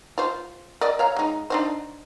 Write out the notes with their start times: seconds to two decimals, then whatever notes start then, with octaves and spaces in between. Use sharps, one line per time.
0.18 F4 C5
0.81 A#4 D5 D#5
0.99 C#5 F5 A#5
1.16 G#3 D#4
1.50 D4 D#4 C5